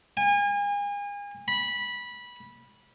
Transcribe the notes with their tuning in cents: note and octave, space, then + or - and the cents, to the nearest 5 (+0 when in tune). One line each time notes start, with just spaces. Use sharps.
G#5 -35
B5 -15